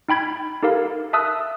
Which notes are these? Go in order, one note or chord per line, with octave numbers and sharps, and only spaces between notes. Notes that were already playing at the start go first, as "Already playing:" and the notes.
D#4 G5 B5 G#6
D#4 G4 A4 A#4 F5
E5 A5 D#6 E6 F#6